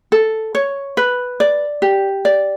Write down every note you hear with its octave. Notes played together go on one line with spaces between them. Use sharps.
A4
C#5
B4
D5
G4
D5